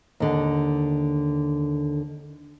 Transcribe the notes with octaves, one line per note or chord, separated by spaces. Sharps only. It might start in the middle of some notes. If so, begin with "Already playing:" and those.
D#2 D3